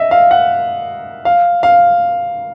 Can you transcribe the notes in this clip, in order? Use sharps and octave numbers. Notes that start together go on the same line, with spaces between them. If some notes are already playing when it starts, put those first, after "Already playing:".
Already playing: D#5 E5
F5
F#5
F5
F5